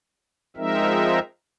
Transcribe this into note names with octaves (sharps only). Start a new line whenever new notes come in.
F3 G#3 C4 D#4 A#4 E5